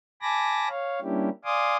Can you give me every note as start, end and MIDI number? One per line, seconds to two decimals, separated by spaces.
0.22 0.69 80
0.22 0.69 81
0.22 0.69 83
0.22 0.69 86
0.22 0.69 94
0.69 1.00 73
0.69 1.00 77
1.01 1.29 55
1.01 1.29 58
1.01 1.29 61
1.01 1.29 62
1.01 1.29 64
1.01 1.29 67
1.45 1.77 74
1.45 1.77 77
1.45 1.77 80
1.45 1.77 84
1.45 1.77 86
1.45 1.77 87